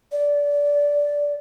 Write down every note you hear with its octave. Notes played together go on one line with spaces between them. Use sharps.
D5